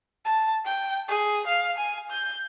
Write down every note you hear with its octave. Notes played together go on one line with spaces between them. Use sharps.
A5
G5
G#4
F5
G#5
G6